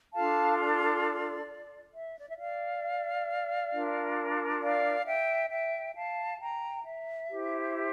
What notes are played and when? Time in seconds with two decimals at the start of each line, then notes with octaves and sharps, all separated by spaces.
0.14 D4 F4 A4 F5 A5
0.59 D5
1.93 E5
2.20 D5
2.28 E5
2.38 D5 F5
3.71 D4 F4 A#4
4.61 D5 F5
5.06 E5 G5
5.50 E5 G5
5.95 F5 A5
6.40 G5 A#5
6.84 E5
7.30 E4 G4 C5